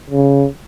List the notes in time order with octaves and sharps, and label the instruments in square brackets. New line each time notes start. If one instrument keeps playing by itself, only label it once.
[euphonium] C#3